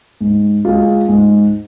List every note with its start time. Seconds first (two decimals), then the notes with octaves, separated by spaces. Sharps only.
0.21 G#2
0.65 G#3 F4
1.08 G#2